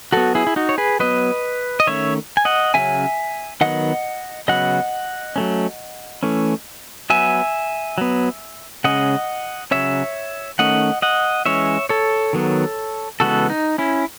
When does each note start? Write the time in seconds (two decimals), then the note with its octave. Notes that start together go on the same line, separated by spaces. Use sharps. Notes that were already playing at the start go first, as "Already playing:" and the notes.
0.12 F#3 B3 F#4 A4
0.35 E4 G#4
0.47 E4
0.56 D#4 F#4
0.69 C#5
0.78 G#4 B4
0.99 F#3 B3 B4 D#5
1.80 D#5
1.87 D#3 A3 C#4 C#5 E5
2.37 G#5
2.45 D#5 F#5
2.74 C#3 F#3 C#4 E5 G#5
3.61 D#3 F#3 B3 D#5 F#5
4.48 C#3 F#3 B3 D#5 F#5
5.36 F#3 A3 C#4
6.23 E3 A3 C#4
7.10 F#3 B3 E5 G#5
7.98 F#3 B3
8.84 C#3 G#3 C#4 D#5 F#5
9.71 C#3 F#3 C#4 C#5 E5
10.59 D#3 A3 C#4 D#5 F#5
11.02 D#5 F#5
11.46 E3 G#3 C#4 C#5 E5
11.89 A4 C#5
12.33 D#3 F#3 B3
13.20 C#3 E3 G#3 B3 F#4 A4
13.50 D#4
13.78 C#4 E4